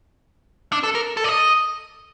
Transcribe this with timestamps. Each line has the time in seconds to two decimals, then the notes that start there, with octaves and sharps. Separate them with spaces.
0.72 D4
0.83 A4
0.95 A#4
1.17 A4
1.24 D5
1.28 D#5